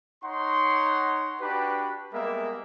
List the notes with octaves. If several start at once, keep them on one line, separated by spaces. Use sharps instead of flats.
D#4 C#5 F#5 A#5 C6
D4 F#4 G4 B4
G3 G#3 A#3 B3 A#4 E5